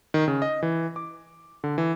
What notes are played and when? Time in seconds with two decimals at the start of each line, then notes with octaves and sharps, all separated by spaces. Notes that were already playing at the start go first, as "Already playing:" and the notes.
0.14 D#3
0.28 C#3
0.42 D#5
0.63 E3
0.96 D6
1.64 D3
1.78 E3